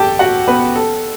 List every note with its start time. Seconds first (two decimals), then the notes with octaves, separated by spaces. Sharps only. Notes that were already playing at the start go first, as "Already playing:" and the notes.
Already playing: G4 A4 G5 A5
0.19 F#4 F#5
0.48 B3 B4
0.75 A4